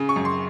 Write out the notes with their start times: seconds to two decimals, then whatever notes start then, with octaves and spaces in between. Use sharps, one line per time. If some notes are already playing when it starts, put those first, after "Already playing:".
Already playing: C#3
0.09 C#6
0.16 F#2
0.25 C6